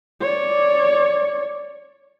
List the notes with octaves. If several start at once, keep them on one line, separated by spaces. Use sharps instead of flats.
C#5 D5